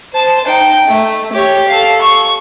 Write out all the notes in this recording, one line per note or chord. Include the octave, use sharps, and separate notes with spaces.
C5 A5
D#4 G5
A3
G4 C#5
A4 F5
C#6